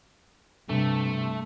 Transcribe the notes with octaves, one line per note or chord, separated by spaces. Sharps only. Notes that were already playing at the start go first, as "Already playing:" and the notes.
G2 C3 A3